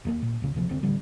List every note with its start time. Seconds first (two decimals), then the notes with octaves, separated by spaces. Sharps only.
0.05 D#2 G#3 A#3
0.22 A#2
0.42 C#2 C#3
0.54 D2 C3 F3
0.69 E1 C2 D3 C4
0.83 A1 D3 G3